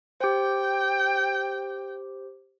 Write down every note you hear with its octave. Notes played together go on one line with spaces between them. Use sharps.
G4 C5 G5